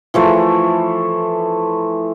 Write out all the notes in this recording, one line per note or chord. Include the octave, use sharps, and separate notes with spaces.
E3 F3 A3